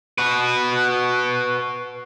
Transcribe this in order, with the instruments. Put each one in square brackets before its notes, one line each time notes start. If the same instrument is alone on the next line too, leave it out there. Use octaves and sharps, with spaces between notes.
[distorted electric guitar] F#4 B4